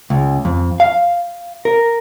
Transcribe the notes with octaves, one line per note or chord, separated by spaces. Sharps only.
C#2
F2
F5
A#4